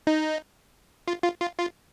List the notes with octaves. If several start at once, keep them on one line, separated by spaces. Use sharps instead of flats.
D#4
F4
F4
F4
F4